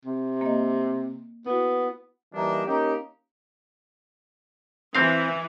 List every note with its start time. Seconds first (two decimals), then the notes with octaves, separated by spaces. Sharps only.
0.05 C3
0.41 A#3 D#5
1.46 B3 E4 F#4
2.34 E3 G3 A#3 D4 D#4
2.66 A#3 C#4 D#4 G4
4.95 E3 C4 F5